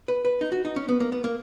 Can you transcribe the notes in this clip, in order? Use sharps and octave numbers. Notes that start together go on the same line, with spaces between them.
B4
B4
D#4
F#4
D#4
C#4
B3
A#3
B3
A#3